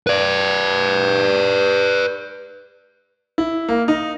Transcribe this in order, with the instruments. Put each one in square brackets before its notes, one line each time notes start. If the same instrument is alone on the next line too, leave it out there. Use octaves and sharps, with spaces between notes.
[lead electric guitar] B4 D5
[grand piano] E4
A#3
D#4